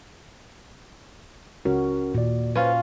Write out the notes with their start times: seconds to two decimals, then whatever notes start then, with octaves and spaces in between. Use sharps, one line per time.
1.65 C#2 C#4 F#4 A#4
2.14 D#2 A#2 D5
2.55 C#4 F4 B4 C5